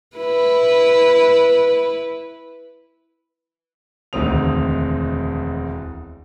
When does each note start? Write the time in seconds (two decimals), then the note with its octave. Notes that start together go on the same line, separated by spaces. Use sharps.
0.17 E4 B4
4.13 E1 D2 D#3 C4 D#6 F7